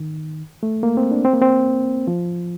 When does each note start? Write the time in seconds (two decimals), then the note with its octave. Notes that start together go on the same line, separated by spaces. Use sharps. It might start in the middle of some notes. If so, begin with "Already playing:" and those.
Already playing: D#3
0.63 A3
0.83 A#3
0.97 C4
1.11 D4
1.25 C4
1.33 A#3
1.41 C4
2.07 F3